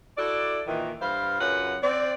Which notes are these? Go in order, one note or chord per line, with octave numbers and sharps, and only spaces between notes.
E4 F#4 A4 D5
A#2 D#3 E3
G2 G3 B4 C5 F5
F#2 C#3 F#3 F4 B4 F#5
C4 D5